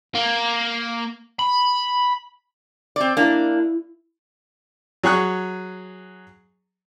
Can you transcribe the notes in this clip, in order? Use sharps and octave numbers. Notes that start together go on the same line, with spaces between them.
A#3
B5
C4 D5
A#3 D4 E4
F#3 G#4 C#6 F#6